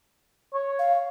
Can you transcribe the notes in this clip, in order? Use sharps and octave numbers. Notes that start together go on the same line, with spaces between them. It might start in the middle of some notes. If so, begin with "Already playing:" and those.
C#5
F5